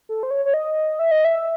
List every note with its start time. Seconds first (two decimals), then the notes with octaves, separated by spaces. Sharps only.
0.09 A4
0.23 C5
0.31 C#5
0.45 C#5
0.54 D#5
0.99 E5
1.11 D#5
1.25 E5